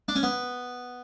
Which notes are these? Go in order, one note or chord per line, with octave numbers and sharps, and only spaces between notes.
D4
C#4
B3